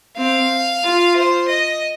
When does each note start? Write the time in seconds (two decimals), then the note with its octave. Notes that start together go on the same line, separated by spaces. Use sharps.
0.18 C4 F5
0.83 F4
1.16 C5
1.49 D#5